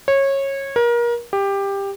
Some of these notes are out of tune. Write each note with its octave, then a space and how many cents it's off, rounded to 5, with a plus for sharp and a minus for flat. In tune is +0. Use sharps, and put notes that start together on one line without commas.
C#5 -20
A#4 +30
G4 +15